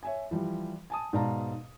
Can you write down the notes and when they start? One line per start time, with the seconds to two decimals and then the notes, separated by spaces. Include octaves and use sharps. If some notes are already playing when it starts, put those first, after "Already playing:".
0.03 C#5 E5 G#5
0.31 E3 F3 G3
0.90 G#5 A5 D#6
1.13 G#2 B2 D5 F5 A5 A#5